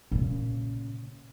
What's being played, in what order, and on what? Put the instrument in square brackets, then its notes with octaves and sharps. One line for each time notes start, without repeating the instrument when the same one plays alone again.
[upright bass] A#2 C#3